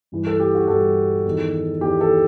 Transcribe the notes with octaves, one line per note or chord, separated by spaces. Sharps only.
G2 E3
A4
G4
F#4
G2 E3 A4
E2 D#3
E2 D#3 G4
A4